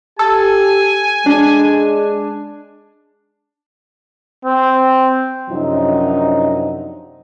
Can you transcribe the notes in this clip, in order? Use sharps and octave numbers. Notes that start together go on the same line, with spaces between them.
G4 A4 G#5
G#3 D4
C4
F#2 C3 F3 F#3 D4 D#4